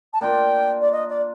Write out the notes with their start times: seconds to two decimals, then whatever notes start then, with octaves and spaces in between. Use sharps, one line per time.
0.13 A5
0.21 A#3 D4 F4 G5
0.81 D5
0.92 D#5
1.09 D5